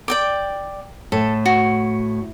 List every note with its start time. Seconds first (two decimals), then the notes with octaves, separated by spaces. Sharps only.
0.08 D5 G5 D6
1.12 A2 A4
1.46 F#4